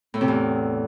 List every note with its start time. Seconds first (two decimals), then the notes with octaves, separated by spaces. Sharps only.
0.14 A2
0.21 C3
0.28 E2